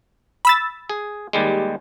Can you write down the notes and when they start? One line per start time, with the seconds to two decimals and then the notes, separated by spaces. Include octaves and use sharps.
0.45 B5 E6 A6
0.89 G#4
1.33 D#2 G3 G#3